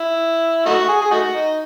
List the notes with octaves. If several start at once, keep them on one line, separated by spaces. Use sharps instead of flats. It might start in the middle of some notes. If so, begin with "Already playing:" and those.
Already playing: E4
A3 D#4 F#4
G#4
G#4
A3 D#4 F#4
D#4